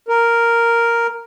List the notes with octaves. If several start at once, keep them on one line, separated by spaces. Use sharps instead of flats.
A#4